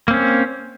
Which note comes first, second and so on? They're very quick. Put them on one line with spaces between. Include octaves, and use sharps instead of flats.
A#3 C4 C#4